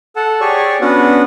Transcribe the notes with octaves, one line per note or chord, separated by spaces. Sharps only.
A4 F#5 A5
G4 G#4 C#5 D5 G#5 C#6
B3 C#4 D4 F#4 B4 F#5